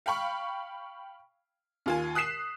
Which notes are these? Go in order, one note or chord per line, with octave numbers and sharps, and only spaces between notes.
F5 G5 B5 C#6
D#2 F4 G#5
D#6 F#6 B6 C7 E7